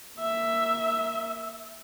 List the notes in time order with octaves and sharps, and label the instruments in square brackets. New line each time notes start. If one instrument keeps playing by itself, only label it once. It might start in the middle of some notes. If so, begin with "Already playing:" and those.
[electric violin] A#3 E5